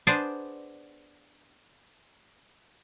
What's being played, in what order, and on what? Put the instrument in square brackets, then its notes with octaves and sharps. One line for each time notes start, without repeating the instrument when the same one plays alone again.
[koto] B3 D4 G#4 C5 D5